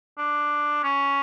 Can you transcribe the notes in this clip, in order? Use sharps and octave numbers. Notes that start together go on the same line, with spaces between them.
D4
C#4